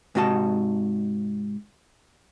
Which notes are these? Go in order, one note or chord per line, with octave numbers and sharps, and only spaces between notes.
G#2 C3 F#4 D#5 A5